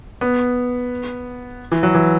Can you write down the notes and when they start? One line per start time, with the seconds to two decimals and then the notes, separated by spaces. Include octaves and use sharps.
0.21 B3
1.72 E3
1.83 F#3
1.95 E3